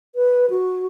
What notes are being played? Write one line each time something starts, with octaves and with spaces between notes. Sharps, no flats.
B4
F#4